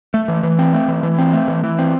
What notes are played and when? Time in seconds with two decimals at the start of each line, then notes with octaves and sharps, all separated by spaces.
0.14 A3
0.28 E3
0.43 E3
0.59 C4
0.74 A3
0.88 E3
1.03 E3
1.19 C4
1.33 A3
1.48 E3
1.64 E3
1.79 C4